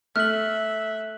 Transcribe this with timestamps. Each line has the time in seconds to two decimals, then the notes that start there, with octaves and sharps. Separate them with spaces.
0.16 A3 E5 F6 F#6 F#7